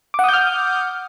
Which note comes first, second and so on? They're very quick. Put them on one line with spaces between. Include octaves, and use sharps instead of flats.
D6 F#5 D#6 G6 F6